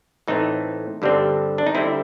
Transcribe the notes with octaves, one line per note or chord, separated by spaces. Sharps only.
A2 E3 A3 C4 D#4
G2 D3 G3 C4
D4
D#4
D3 G3 C4 E4